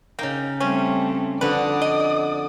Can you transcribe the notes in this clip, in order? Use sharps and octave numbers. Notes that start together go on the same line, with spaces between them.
C#3 A#3 D#4 G5
G3 A3 C4 C#4
F2 D3 F#4 B4 D5 D#6
D#5